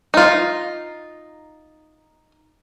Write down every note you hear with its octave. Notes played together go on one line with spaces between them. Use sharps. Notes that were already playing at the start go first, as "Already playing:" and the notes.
D#4 F4